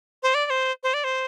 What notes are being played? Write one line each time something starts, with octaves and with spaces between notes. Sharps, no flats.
C5
D5
D5
C5
C5
D5
C5